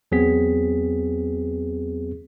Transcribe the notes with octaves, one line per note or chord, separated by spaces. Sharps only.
E2 F#3 B3 C4 G#4 B6